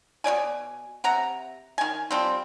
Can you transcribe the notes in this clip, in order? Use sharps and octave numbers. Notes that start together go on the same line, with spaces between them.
B2 D4 D5 G#5
C3 F#5 A#5
D#3 G#5
F3 G3 C4